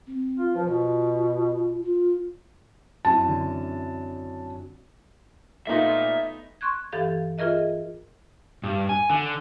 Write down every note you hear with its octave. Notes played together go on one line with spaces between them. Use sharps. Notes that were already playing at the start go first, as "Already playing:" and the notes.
C4
F4
F3 B4
B2 F4
F4
F#2 C4 E4 A5
D3
A#2 A3 B3 D#4 E5
C6 C#6 F#6 G#6
G2 E3 G4 A4 F5 A6
F4 G#4 A#4 D#5 E5
G2
G#5
D3